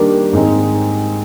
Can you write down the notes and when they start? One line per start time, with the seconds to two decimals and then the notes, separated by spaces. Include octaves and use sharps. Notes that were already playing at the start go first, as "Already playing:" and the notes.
Already playing: D#3 G3 A#3 D4 G4 A#4
0.33 G#2 D#3 G#3 C4 D#4